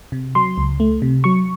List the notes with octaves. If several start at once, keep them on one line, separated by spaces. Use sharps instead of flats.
C3
F#3 C6
C#2
A3
C3
F#3 C#6